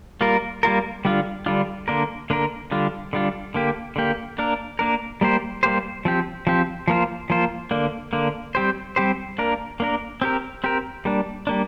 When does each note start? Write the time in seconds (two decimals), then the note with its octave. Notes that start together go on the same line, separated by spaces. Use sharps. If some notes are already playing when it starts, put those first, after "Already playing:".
0.21 G3 A#3 F4 A#4
0.63 G3 A#3 F4 A#4
1.05 D3 G3 D4 F4
1.46 D3 G3 D4 F4
1.88 D3 A#3 D4 A#4
2.30 D3 A#3 D4 A#4
2.71 D3 G3 D4 F4
3.13 D3 G3 D4 F4
3.54 D3 A#3 G4
3.96 D3 A#3 G4
4.38 A#3 D4 A#4
4.79 A#3 D4 A#4
5.21 G3 A#3 G4 C5
5.63 G3 A#3 G4 C5
6.05 F3 C4 G4
6.47 F3 C4 G4
6.88 F3 A#3 F4 C5
7.30 F3 A#3 F4 C5
7.71 D3 A#3 D4
8.13 D3 A#3 D4
8.55 G3 C4 G4 C5
8.96 G3 C4 G4 C5
9.38 A#3 D4 A#4
9.80 A#3 D4 A#4
10.22 C4 G4 A#4
10.64 C4 G4 A#4
11.05 G3 A#3 D4
11.47 G3 A#3 D4